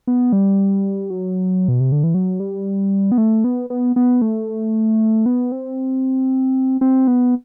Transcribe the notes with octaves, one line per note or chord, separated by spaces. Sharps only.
B3
G3
F#3
B2
C3
D3
E3
F#3
G3
B3
A3
B3
B3
B3
A3
B3
C4
C4
B3